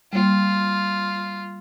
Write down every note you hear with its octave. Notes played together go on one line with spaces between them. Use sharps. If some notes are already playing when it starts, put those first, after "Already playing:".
G3 A#3 F4